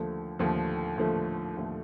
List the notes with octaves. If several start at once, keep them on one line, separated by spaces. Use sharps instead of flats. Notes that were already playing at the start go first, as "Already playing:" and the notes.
Already playing: D#2 D3 F3 A3
D#2 D3 F3 A3
D#2 D3 F3 A3
D#2 D3 F3 A3